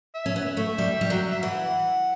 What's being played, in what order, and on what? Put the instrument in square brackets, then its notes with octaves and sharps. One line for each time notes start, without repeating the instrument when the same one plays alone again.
[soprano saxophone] E5
[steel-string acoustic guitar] C#4
B3
[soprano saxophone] E5
[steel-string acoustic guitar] A3
G3
G3
F#3
[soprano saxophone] E5
[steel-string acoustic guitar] E3 [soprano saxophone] F#5